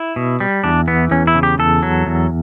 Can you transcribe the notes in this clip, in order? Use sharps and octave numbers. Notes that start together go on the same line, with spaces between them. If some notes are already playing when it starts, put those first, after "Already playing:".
Already playing: E4
B2
G3
E2 D4
E3 B3
E2 C#4
E4
C#3
G4
E2 A4
F#3
E2